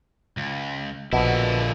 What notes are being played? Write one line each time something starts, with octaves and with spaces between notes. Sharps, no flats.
C#2
A#1 B2 D3 E4